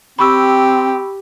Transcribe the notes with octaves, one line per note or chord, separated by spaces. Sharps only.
C4 G4 B5 C#6 E6